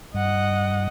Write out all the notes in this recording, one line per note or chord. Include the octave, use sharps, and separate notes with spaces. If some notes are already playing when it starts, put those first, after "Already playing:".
G2 D#5 F#5